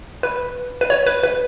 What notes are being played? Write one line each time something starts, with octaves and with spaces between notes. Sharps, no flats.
B4
B4
C#5
B4
B4